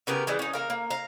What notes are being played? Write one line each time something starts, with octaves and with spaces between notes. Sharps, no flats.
C#3 B3 G4 A#4
E3 G3 G#3
C#4 D#4
A#3 A#4 F5
A#3
F5 A#5